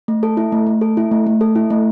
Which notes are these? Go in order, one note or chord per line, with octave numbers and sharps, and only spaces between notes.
A3
A4
E4
A3
A3
A4
E4
A3
A3
A4
E4
A3